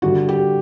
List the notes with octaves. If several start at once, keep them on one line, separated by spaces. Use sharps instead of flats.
G2 D3 G3 D4 F#4
G4